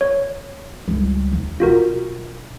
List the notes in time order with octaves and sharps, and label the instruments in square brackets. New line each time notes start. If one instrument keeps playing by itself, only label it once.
[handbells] C#5
[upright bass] C#2 G3
D#2
[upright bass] B1 D4 [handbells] F4 F#4 A#4